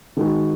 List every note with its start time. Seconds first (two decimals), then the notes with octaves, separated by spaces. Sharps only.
0.17 D#3 G#3 D#4 F#4